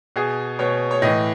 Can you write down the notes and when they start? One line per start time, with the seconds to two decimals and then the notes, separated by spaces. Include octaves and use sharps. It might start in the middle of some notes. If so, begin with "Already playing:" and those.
0.16 B2 G#4
0.59 B2 C#5
0.91 C#5
1.02 A2 E3 D#5